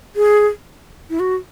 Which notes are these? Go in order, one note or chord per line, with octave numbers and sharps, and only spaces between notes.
G#4
E4
F#4